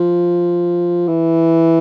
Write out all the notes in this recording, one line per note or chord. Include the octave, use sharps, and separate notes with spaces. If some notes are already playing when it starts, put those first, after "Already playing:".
Already playing: F3
E3